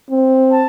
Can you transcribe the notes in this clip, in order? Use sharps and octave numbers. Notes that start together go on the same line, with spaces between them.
C4
A5